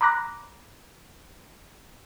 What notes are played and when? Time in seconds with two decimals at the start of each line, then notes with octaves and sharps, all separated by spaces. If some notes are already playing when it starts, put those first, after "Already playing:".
0.01 A#5 B5 D6 F#6 A#6